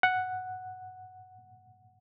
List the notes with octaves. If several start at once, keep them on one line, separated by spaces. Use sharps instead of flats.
F#5